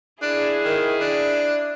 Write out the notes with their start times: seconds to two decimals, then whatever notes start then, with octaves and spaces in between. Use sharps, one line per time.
0.22 D4 E4 G#4
0.65 D#3
1.01 D4